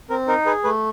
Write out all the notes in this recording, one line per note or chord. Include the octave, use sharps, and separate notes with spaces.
C4 A#4
D#4 A#4
G#4 B4
A3 B4